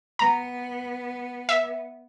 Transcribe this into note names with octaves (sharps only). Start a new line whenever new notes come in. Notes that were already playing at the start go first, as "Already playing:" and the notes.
B3 A#5
E5